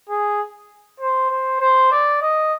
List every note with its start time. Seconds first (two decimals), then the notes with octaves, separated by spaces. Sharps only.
0.09 G#4
1.00 C5
1.30 C5
1.60 C5
1.92 D5
2.22 D#5